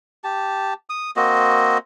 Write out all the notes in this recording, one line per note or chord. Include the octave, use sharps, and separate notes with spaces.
G4 A5
D#6
A#3 C4 F#4 D#5